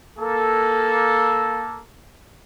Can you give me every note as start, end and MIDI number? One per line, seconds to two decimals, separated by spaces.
0.18 1.82 58
0.18 1.82 69